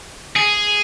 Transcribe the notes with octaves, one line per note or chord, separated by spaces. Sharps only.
G#4